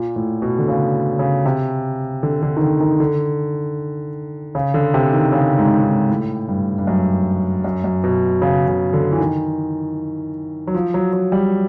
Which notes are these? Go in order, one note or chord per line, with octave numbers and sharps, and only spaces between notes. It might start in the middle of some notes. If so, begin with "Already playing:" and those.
Already playing: A#2
A2
B2
D3
C#3
C#3
C3
D3
D3
D#3
D3
D#3
D3
C#3
D3
C3
D#3
C#3
G#2
G#2
A2
G2
G2
F#2
F#2
F#2
B2
C#3
C#3
D3
E3
D#3
F#3
F3
F#3
F#3
G3